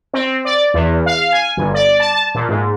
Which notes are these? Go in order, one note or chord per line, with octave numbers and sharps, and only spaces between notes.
C4
D5
E2
F5
G#5
G1
D5
A5
A#2
G#2